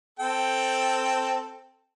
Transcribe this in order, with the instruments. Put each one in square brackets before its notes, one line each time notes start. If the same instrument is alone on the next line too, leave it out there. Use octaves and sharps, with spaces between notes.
[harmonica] C4 A4 G5